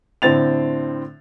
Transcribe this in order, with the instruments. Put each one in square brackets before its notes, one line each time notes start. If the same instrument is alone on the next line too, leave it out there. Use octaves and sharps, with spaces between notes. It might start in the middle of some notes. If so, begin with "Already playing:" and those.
[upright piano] A2 D3 C4 A6 F7